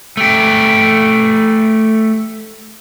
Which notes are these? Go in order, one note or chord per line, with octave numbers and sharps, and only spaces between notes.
A3 G4